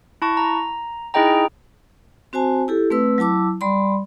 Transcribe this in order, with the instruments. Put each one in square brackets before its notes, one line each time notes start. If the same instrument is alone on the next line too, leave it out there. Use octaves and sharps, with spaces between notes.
[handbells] E4 A5 C#6
A#5
D#4 E4 G#4 D#5 G5 A#5
[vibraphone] C4 F#4 C5 G#5 A5
E4 G4 A4
A3 C4 B4 E6
F#3 E4 A5 D6 E6
G3 D5 B5 C6